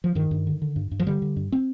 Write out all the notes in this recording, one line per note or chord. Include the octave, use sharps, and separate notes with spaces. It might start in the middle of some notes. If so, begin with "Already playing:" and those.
F3
G2 D#3
G2
D3
D3
G2
G2
F3
D3 G3
D3
G2
C4